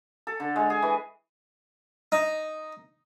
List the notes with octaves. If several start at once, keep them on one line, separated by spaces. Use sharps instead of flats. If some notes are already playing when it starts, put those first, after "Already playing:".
A4
D3
G#3
G#4
E3
D#4